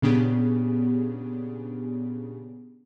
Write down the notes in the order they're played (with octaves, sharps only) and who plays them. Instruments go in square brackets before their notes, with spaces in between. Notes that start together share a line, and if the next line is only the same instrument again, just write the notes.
[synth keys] A#2 C#3 B3 D4 G4 G#4